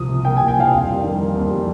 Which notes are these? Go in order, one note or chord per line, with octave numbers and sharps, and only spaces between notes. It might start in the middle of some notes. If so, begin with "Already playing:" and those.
Already playing: C2 F3 D#6
C3
A#3 G5
G#5
C2
G5
F3 F5
F2
G3
D#3
A#3
F2
G3